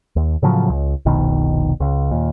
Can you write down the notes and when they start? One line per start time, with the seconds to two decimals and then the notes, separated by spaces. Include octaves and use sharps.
0.16 D#2
0.42 A2 C#3 F3 F#3
0.70 C#2
1.06 F1 C2 B2 D#3
1.80 C#2
2.11 D#2 A#2